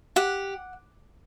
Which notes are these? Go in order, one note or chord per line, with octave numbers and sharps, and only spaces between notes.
G4 F#5